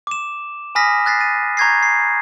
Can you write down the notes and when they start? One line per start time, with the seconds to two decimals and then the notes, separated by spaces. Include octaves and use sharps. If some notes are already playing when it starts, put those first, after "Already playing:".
0.07 D6 E7
0.75 G#5 B5 D#6 F6 A#6 B6
1.05 F6 F#6 A6 B6 C7
1.20 A6 D#7
1.57 A#5 C#6 G6 G#6 A#6 C7
1.83 C7